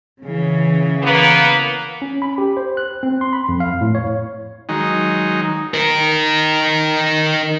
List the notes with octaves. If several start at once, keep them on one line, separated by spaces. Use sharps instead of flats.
C#3 E3
A#3 B3
C#4
B5
G4
C5
F#6
C4
C6
B5
F2
F5
A2
C#5
D#3 F#3 G#3 D#4
D#4 A#4